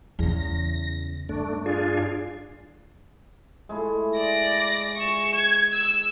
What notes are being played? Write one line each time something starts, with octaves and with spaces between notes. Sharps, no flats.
E2 C#3 A#6
G2 A3 D4
D4 F4 G#4
G#3 A3 E4
D5 A#6
G#4 C#6 E7
G#6
E6